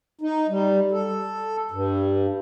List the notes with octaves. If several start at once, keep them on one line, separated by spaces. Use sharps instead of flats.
D#4
G3
A4
G2